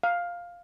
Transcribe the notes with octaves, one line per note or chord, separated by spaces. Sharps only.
F5